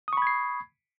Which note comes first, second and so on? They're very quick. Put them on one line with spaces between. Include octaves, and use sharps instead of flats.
D#6 C#6 B5 G#6 C7